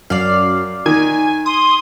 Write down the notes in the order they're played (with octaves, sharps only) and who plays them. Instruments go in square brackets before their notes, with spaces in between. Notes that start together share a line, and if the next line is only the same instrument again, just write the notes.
[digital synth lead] F#2 [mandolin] D5 F5
[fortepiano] D#3 [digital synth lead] G#5
[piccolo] C6 [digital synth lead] D#6